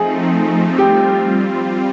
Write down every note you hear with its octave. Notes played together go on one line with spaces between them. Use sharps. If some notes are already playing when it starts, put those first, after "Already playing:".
Already playing: F3 A3 C4 D#4 G#4
G3 C4 F4 G4